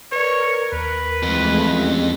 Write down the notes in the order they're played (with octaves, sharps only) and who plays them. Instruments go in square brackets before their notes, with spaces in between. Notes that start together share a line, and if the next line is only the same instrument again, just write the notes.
[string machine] A#4 [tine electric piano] B4 D5 [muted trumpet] C#5
[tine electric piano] D#2 [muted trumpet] B4
[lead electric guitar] F2 [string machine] E3 G#3 A3
[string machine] E2 [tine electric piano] C#4 G4